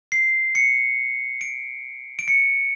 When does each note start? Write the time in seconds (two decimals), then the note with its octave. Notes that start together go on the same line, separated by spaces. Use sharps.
0.12 C7
0.55 C#7
1.41 D7
2.19 D7
2.28 C#7